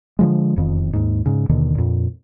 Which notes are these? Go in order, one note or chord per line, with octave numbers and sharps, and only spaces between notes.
D3 F3 G#3
E1 F2 D#3
D#2 G#2
G#2 C#3
D#2 B2 D3 D#3
F2 A#2